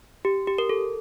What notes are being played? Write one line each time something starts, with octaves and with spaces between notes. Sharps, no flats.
G4
G4
A#4
A4